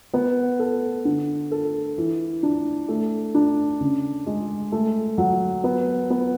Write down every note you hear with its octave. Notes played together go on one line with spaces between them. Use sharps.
B3
A4
D3
A4
E3
D4
A3
D4
C#3
G#3
A3
F#3
B3
B3